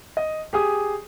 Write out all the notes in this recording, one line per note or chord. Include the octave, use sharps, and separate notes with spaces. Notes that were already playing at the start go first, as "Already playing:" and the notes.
D#5
G4 G#4 D#6